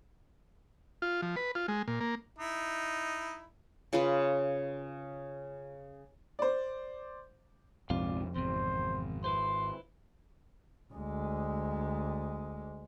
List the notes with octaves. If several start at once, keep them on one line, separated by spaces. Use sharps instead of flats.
F4
F3
B4
F4
G#3
A#2
A#3
D#4 E4
C#3 F4 B4 B5
C5 D5
A#1 F2 G#2 C3 F4 D5 F5
G#1 E2 C3 C5
E4 B4 C5 C6
D2 G#3